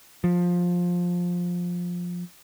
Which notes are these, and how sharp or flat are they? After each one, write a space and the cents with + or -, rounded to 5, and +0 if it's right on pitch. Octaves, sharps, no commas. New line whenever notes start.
F3 +15